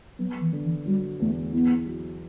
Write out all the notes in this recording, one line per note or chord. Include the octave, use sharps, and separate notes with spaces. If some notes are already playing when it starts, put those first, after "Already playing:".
F#3 B3
E3
D3
E3
F#3 G3
E2 A3
B3 E4
F#3